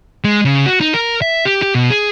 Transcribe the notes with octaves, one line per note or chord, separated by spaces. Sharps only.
G#3
C#3
F#4
D#4
A#4
E5
G4
G4
B2
G#4